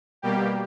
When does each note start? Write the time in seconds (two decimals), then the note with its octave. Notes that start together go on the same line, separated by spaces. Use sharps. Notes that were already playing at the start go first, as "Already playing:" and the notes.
0.22 B2 G3 A#3 G4